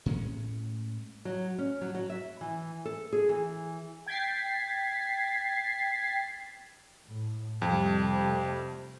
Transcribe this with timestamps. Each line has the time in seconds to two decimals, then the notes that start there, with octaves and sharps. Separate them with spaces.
0.06 A2 G#3 C#4
1.25 F#3
1.58 C#4
1.81 F#3
1.95 F#3
2.10 E5
2.41 E3
2.85 A4
3.13 G#4
3.29 E3
4.06 G5 G#6 A6 B6 C7
7.07 A2
7.62 F2 C3 G3 A3